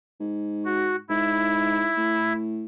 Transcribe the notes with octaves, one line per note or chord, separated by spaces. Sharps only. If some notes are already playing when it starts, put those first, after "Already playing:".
G#2
F#4
G#2 E4
A2